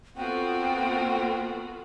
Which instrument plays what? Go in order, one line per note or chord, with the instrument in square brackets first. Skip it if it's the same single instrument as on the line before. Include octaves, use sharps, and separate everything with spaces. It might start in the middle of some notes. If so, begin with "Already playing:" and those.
[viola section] B3 F4 A4 [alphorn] C4 [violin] F#4 [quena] G5